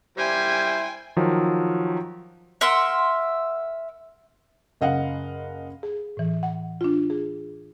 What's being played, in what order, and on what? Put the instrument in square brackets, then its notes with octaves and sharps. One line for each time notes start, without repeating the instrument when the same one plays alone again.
[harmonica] G3 E4 [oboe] C5 [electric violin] G5 G#5
[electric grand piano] D#3 F3 F#3
[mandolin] A#4 E5 F#5 C6
[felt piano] F#1 D#5 F5 F#5
[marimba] G#4
A2 E3
F#5
D4 F4
G#4